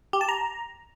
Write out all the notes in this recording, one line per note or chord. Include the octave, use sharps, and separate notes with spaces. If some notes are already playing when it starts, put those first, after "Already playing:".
G4
A5
A#5